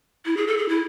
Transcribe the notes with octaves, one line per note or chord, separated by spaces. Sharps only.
E4
G#4
A4
G#4
E4